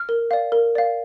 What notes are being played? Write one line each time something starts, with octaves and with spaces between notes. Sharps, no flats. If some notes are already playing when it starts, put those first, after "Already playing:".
Already playing: F6
A#4
D5 F5
A#4
D5 F5